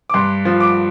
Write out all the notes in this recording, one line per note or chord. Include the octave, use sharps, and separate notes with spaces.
D6
G2 C6
F3
D6